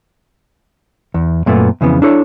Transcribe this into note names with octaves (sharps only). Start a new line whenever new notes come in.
E2
F#2 A#2 A3 B3
F2 C#3 E3 B3
D4 E4 A4 C#5